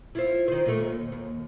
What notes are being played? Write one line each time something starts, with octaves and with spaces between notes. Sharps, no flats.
E4 F4 C5
D#3 C5
A#2 A3
D#2
D#2